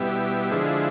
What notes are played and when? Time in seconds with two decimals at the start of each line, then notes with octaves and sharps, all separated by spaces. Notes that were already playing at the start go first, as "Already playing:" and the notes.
Already playing: B2 G3 E4
0.51 D3 F3 G#3